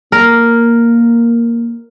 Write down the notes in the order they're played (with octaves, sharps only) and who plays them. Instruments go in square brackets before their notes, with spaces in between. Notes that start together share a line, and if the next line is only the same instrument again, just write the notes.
[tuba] A#3 [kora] A#4